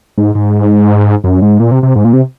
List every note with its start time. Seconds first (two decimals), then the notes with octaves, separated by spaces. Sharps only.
0.18 G#2
0.35 G#2
1.24 F#2
1.42 G#2
1.60 A#2
1.71 C3
1.83 C3
1.96 G#2
2.04 A#2
2.13 C3